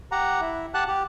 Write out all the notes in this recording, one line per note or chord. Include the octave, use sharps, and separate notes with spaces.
G4 F#5 A#5
E4
G4 F#5 A5 F#6
G4